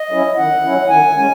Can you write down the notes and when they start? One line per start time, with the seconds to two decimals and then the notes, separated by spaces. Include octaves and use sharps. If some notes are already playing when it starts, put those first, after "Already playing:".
Already playing: D#5
0.11 F#3 C#4 E4
0.37 D#3 F#5
0.64 F#3 C#4 E4
0.89 D#3 G#5
1.16 G#3 C#4 G#5